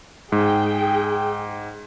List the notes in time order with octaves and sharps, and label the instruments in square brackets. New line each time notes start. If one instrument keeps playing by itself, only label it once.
[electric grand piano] G#2 [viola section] G#4 G5